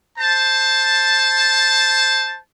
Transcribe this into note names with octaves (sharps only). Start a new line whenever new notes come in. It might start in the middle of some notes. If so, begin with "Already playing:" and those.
C5 A5